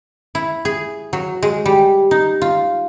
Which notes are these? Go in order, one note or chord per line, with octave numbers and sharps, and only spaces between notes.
E4
G#4
F#3
G#3
G3
D#4
F4